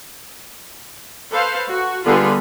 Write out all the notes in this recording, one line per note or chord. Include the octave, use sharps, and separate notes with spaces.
A4 B4 C5 F5
F#4
D3 G3 B3 F4 G#4 B5